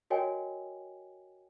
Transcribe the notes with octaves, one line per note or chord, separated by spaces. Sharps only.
F#4 A#4 C#5 D#5 G5 G#5